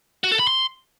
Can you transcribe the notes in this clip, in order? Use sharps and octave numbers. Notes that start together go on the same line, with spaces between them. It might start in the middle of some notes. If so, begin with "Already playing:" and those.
F#4
A4
B5
C6